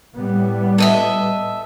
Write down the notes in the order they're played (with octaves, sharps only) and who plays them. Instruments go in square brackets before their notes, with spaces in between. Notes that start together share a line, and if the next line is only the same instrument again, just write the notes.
[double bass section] A2 G3 B3
[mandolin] A4 D#5 E5